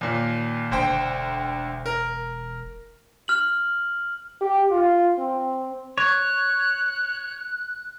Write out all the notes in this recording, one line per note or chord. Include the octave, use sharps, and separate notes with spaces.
D#2 A#2
E1 D2 C5 G5
A#4
F6 F#7
G4
F4
C4
C#5 F#6